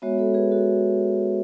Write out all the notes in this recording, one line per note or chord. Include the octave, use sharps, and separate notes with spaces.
G#3 B3 F#4 C#5 E5
A4 C#5
G#4 B4
F#4 A4